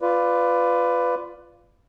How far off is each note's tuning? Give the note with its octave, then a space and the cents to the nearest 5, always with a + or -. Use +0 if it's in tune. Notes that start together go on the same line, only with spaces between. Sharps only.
F4 +0 B4 +15 D5 +0